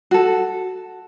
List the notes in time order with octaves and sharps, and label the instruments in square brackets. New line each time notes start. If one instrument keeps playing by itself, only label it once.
[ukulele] F#4 A4